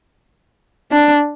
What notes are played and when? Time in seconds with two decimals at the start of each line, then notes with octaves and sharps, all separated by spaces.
0.92 D4